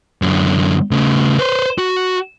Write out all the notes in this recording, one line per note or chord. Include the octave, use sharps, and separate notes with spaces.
F#2 D3
C#3 A3
B4 C5
F#4